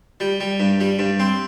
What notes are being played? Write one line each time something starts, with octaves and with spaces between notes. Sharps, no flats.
G3
G3
G2
G3
G2
C4